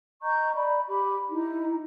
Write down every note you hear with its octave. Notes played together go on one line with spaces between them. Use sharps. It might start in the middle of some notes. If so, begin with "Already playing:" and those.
D#5 A#5 C#6 G6
D5 B5
G4 B5 D6
D#4 E4